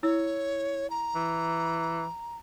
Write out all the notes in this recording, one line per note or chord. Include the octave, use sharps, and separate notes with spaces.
E4 C#5 E6
A#5
E3